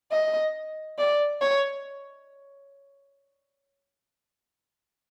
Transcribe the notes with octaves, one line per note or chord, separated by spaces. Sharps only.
D#5
D5
C#5